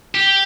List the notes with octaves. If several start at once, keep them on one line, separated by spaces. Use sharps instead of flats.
G4